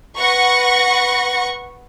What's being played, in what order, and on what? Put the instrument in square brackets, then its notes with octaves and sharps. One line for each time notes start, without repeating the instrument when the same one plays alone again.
[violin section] B4 F#5 C#6 A#6 C#7